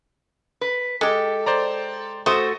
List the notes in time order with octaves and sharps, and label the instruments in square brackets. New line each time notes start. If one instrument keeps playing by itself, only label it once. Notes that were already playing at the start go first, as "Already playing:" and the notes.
[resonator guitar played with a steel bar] B4
[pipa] G#3 G4 [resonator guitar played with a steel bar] A4
[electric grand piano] C5 D5 A#5
[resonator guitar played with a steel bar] A3 F#4 [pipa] C5 [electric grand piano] C#6 D#6